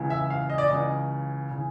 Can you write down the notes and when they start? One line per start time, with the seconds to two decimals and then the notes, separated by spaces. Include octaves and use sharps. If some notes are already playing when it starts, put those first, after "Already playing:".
Already playing: C#2 C#3 E3
0.10 E5
0.30 F5
0.50 D#5
0.58 D5
0.68 C#2 C#3 E3 D#5
1.51 C#3 E3